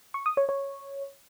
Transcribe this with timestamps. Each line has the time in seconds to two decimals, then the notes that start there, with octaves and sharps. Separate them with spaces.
0.14 C#6
0.26 D#6
0.37 C#5
0.49 C#5